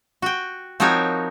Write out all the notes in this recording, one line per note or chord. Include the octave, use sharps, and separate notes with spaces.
F#4 G5
F3 C4 D#4 F#4 A#4 C#5